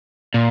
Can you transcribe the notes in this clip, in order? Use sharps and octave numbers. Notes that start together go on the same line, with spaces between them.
A#2